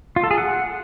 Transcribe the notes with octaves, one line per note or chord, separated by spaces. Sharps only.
F4
A4
G#4
F#5